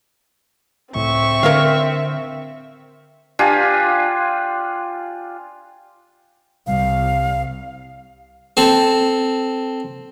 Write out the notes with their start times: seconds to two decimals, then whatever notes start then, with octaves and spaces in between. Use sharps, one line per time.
0.95 C#2 A2 C4 E5 C#6
1.43 D3 A#4 C#5 F5
3.39 D4 F4 G4 G#5
6.67 C2 F5
8.57 C4 A4